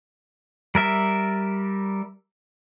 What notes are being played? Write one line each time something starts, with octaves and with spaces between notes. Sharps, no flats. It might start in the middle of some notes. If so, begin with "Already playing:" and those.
G3 A#4 E5